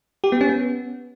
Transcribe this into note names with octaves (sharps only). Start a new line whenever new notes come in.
G4
B3
C#4
B3